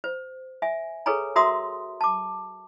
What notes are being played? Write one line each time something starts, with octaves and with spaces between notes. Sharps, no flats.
C5
E5 G#5
G#4 A4 B4 C#5 G#5 A#5
F#4 A#4 E5 A#5 C6 D#6
A5 D6